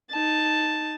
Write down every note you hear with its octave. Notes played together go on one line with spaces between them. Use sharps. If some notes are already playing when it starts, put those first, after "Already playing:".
D#4 A5